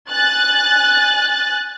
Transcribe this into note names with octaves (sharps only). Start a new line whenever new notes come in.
G#5 F#6 A6